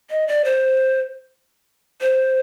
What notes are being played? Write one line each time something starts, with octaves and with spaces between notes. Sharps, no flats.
D#5
D5
C5
C5